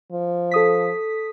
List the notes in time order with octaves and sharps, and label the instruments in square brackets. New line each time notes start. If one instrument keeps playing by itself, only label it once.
[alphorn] F3
[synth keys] A4 D#6 B6